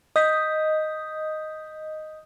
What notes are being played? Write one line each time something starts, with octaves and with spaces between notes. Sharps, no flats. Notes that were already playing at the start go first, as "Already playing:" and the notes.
D#5 D#6 G6 B6